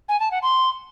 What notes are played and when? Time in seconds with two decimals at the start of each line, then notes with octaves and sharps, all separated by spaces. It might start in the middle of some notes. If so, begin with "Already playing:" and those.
0.09 G#5
0.20 A5
0.31 F#5
0.42 C6